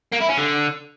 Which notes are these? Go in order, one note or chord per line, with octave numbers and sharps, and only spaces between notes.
A#3
E4
C#4
D3